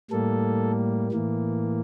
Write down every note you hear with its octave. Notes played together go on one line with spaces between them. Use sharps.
A2 G3 A#3 A4
A2 E3 A#3